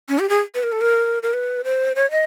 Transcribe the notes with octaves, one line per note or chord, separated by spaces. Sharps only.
C#4
G4
G#4
B4
A#4
A4
A#4
A#4
B4
C5
C#5
D#5